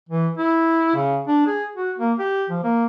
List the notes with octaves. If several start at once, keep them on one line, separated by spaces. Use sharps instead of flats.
E3
E4
C#3
D4
G#4
F#4
A#3
G4
F3
A#3